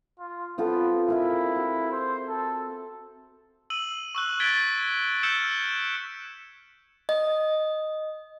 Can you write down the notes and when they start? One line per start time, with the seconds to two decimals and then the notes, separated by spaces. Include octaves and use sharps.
0.19 F4
0.58 B3 C4 F4 A4
1.08 E4 G#4 A#4 E5
1.56 F#4
1.91 C5
2.28 A4
3.70 E6 D#7 F#7
4.15 C#6 E6 F#6
4.40 G#6 A6 B6 D7 G7
5.23 E6 F6 G6 C#7 E7
7.09 D#5